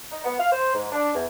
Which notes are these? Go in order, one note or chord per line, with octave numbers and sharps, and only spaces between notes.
D#4
B3
F5
C5
G#2
D4
E2